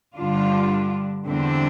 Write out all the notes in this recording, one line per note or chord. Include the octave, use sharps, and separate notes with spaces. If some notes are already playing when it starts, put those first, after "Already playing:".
G2 D3 G3 D4 F4
E2 D3 G3 C4 D4